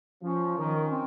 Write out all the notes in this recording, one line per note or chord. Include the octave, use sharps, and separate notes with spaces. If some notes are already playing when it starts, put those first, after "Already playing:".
F3 C#4
D#3
C4